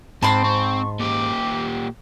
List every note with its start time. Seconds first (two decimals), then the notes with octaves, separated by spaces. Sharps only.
0.22 G#2 C4 A5 B5 C6
0.44 C4 C#6
1.00 A#2 G4 D6